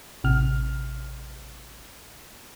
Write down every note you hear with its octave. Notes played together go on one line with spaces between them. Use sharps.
A1 C3 F6